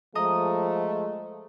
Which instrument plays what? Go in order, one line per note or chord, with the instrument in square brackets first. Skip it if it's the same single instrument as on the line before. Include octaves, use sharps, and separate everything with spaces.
[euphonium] F3 [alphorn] G#3 [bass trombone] A3 [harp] D#5 A#5 D#6